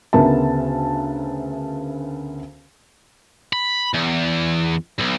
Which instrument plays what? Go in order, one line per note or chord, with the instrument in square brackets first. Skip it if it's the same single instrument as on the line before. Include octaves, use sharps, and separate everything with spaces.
[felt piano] D2 C#3 B3 A#4 E5 A5
[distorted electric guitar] B5
E2
B1